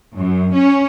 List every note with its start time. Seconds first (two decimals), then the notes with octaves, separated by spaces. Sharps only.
0.16 F#2
0.55 C#4